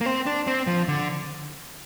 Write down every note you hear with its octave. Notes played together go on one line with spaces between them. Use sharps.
A#3
C4
D4
C4
F3
D3